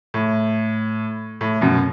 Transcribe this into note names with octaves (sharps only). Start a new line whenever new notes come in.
A2
A2
F#2 B2